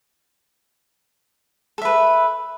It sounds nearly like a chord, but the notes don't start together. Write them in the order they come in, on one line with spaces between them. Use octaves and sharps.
A4 E5 B4